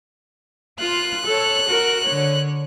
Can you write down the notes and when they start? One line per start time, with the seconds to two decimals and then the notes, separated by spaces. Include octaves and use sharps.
0.80 F4 F#6
1.26 A4 C#5
1.68 F#4 A#4
2.05 D3 C#5